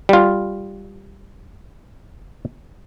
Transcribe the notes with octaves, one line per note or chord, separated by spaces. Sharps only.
G3 F4